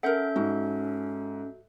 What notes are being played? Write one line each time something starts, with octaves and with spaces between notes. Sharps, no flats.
C#4 A4 A#4 E5 F#5 G6
G#2 F#4